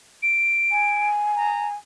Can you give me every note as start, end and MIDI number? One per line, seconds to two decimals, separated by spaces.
0.23 1.08 98
0.72 1.75 80
1.36 1.68 82